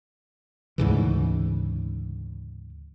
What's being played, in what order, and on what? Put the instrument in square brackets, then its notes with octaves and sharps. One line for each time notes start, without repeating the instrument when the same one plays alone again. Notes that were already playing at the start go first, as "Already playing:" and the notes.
[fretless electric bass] D2 G#2 C#3 E3